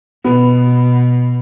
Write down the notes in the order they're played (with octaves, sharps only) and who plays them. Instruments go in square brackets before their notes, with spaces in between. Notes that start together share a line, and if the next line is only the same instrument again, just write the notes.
[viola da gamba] B2 [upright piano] B3